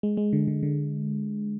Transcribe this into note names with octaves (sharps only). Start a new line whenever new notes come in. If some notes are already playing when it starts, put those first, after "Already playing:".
G#3
G#3
D3
D3
D3